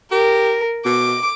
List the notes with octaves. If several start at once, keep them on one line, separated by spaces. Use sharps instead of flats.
G4 A#4
B2 D6